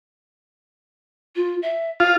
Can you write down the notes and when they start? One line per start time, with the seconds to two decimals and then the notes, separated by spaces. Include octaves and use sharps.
1.35 F4
1.62 E5
2.00 F4 F5